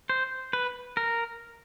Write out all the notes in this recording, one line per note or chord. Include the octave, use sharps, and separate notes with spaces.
C5
B4
A#4